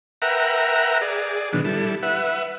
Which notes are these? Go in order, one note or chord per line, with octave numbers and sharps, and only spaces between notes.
A#4 B4 E5 F#5 G5 A#5
G#4 D5
A#2 D#3 F#3 B3 D4
G3 E4 A4
B4 E5 F#5